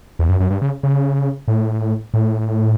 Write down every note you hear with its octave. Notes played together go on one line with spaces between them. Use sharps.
E2
F#2
F#2
G2
C#3
C#3
A2
A2